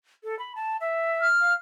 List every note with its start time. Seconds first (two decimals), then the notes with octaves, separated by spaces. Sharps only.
0.24 A4
0.39 B5
0.55 A5
0.81 E5
1.21 F6
1.41 F5